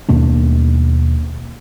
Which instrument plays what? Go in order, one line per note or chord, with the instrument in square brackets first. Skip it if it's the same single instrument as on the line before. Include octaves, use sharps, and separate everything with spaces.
[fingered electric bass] D#2 B2 A#3 D4